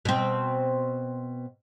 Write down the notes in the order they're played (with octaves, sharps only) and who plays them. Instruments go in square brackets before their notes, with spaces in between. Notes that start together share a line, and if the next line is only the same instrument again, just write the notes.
[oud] B2 C4